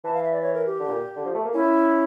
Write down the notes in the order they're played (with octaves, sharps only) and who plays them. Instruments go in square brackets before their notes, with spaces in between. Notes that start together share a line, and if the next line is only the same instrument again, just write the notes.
[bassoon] E3 [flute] A5
[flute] F5
E5
D5
C#5
A#4
G4
[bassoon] D3
A#2
D3
F3
A3
A#3
[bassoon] C#4 [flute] E4